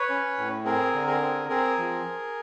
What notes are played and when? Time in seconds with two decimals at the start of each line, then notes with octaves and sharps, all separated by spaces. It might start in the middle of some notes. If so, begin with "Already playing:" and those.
Already playing: B4 C#5
0.10 C#4
0.38 A2
0.65 C4 G#4 A#4
0.94 D3
1.07 G#4 A#4
1.22 C4
1.49 C4 G#4 A#4
1.78 F3